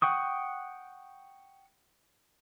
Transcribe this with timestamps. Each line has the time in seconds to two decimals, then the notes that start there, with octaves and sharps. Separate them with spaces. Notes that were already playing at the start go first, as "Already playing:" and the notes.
0.02 F#5 G5 C#6 D#6